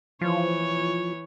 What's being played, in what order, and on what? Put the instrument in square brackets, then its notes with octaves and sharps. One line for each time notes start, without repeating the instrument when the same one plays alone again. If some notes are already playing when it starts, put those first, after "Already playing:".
[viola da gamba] E3 C#5 [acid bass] F3